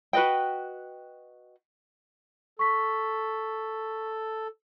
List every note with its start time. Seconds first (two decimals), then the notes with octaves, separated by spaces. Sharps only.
0.13 F#4 B4 D#5 G5
2.59 A4 C#6 B6